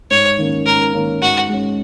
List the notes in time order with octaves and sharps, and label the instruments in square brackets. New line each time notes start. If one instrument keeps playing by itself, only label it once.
[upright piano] G#2 [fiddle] C#5
[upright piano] D#3 A#3 C#4
[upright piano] G#2 [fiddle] A#4
[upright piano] D#3 A#3 C#4
[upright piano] G#2 [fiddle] F#4
[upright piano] G#3 C#4